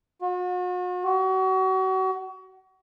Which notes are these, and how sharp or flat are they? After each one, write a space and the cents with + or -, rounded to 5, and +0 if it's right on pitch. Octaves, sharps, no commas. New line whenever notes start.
F#4 -40
F#4 +35